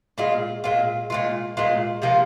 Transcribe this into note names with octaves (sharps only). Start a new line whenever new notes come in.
A#2 G#3 F4
A#2 G#3 F4
A#2 G#3 F4
A#2 G#3 F4
C3 F3 A#3 F4